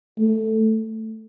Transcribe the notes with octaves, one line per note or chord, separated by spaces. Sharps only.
A3